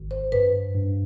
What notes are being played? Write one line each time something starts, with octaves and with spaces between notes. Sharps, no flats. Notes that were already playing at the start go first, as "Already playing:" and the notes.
Already playing: G#1
C5
G2 B4
G2